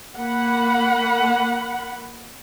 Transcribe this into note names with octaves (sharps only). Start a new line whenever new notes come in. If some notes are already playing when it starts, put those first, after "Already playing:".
A#3 F#5 B5